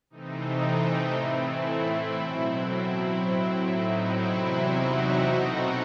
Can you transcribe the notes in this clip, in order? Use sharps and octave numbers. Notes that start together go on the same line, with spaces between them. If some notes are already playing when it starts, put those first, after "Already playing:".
C3 E3 A3 C4 D#4
A2 E3 A3 C4 E4
B2 F#3 C4
E4
A2 F#3 C4
D#4
E2 C3 F#3 C4 E4
D#4 F#4
B2 A3 C4